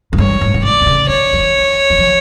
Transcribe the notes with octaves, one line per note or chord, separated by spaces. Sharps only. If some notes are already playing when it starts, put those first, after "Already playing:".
G#2
G2 C#5
G#2
G#2
A2 D5
D3
C#3
D3 C#5
E3
D#3
E3
F3